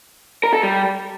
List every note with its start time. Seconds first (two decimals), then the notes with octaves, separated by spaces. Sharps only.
0.44 A#4
0.53 A4
0.63 G3